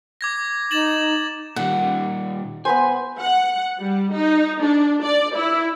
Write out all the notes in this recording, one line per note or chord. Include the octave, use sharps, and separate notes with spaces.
D6 G#6 A#6
D#4 A6 E7 F#7
A#2 D#3 G3 F#5
B3 B4 C5 G#5
F#5
G3
D#4
D4
D5
E4